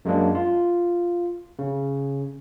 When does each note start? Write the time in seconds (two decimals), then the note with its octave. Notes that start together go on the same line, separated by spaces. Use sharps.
0.05 F#2 G#3 A#3 D4
0.35 F4
1.59 C#3